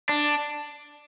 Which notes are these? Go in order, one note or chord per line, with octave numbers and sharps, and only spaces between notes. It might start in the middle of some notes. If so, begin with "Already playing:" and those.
D4